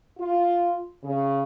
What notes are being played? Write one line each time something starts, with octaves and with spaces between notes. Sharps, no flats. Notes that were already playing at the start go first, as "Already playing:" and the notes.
F4
C#3